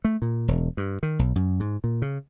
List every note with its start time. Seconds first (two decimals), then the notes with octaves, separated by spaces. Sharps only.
0.05 A3
0.22 A#2
0.48 E1
0.77 G2
1.03 D#3
1.19 B1
1.35 F#2
1.60 G#2
1.84 A#2
2.02 C#3